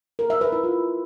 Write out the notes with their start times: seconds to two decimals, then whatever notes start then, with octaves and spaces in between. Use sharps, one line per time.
0.19 A#4
0.30 E5
0.41 B4
0.52 E4
0.64 F4